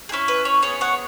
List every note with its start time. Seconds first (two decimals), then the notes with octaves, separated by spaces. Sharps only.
0.09 G#4
0.12 C#4 E4
0.28 B4
0.45 C#5
0.62 B3 G#4 C#5
0.81 C#5 F#5